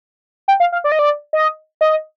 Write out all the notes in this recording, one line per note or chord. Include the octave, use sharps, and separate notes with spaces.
G5
F5
F5
D5
D#5
D5
D#5
D#5